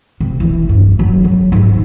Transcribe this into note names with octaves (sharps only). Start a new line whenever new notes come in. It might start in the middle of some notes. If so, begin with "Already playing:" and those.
C3
E3
G2
F#3
C#3
G#2
D#3